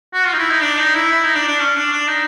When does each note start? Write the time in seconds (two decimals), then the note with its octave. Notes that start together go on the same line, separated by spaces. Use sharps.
0.13 F#4
0.26 F4
0.33 D#4
0.38 E4
0.50 D#4
0.63 D4
0.79 D#4
0.94 E4
1.11 E4
1.23 D#4
1.35 D4
1.48 D4
1.60 C#4
1.76 D4
1.92 D4
2.08 D#4